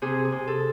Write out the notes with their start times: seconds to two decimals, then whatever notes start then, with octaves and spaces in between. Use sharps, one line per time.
0.02 C3 G#4
0.24 G#4
0.32 C3
0.47 A4